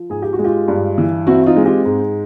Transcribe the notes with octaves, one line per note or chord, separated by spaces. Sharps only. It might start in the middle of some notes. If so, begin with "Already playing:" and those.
Already playing: F3
G#2 G#4
G4
F#4
G#3
F4 G4
G2
E3
C4 E4 F#4
D#4 F4
G#3
F4 G4
G#2